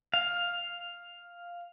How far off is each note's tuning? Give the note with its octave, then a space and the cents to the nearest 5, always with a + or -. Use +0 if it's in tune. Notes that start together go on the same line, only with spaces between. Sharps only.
F5 +5